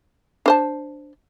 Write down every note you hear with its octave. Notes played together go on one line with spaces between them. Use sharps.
D4 C5 A5